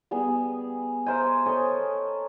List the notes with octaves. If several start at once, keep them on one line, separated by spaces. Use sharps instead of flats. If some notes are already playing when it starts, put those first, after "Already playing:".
G3 B3 G#4
A#4 C5 D#5 E5 G#5
A4 C#5 D#5 G#5 C6